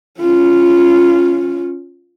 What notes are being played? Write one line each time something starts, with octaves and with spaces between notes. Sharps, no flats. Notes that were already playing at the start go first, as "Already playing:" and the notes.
C#4 F4